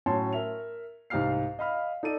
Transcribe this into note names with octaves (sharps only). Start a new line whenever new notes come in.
A2 F#3 C#4 C#5 A5 C6
A#4 E5 F7
C2 G#2 G4 F5 F6 C7
D#5 F5 B5 F6
D#4 A4 D5 D#7